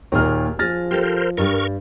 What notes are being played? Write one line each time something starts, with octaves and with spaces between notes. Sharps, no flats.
D#2 A#2 D#4 G#4 A#4 F6
F3 C#4 G#4 F6 A6 A#6
G4 A4 A#4 C5
G2 G3 A#4 C#6